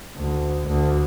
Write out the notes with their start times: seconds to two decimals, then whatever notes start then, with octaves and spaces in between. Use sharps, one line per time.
0.17 D2
0.67 D2